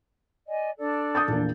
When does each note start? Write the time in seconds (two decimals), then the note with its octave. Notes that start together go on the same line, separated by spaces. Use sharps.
0.47 D5 D#5 G#5
0.77 D4 A4 D5
1.15 D#6 G6 A6
1.28 A#1 E2 A#3